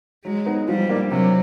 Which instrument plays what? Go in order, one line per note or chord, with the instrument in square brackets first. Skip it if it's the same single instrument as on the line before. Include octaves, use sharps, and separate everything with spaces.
[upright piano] F#3 [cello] G#3
[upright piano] B3 D#4
[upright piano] F3 [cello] G3
[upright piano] A#3 D4
[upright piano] C3 [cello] F#3